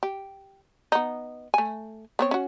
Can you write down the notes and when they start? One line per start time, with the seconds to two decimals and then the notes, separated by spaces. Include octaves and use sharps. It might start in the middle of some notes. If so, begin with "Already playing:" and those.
0.03 G4
0.92 B3 D#4
1.54 A3 G#5
2.19 B3 C4 C#5
2.31 C#4 F#4